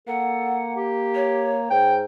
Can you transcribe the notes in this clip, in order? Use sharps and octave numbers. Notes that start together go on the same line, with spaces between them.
A#3 A4 F#5
G4
C#5
G#2 G5